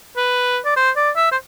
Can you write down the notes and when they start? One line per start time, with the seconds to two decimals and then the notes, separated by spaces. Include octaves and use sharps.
0.16 B4
0.65 D5
0.76 C5
0.96 D5
1.16 E5
1.31 C5